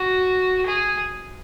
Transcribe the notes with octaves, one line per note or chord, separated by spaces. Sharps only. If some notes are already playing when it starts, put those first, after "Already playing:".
Already playing: F#4
G#4